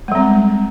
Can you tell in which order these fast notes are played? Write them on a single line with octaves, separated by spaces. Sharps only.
G#3 G3 C4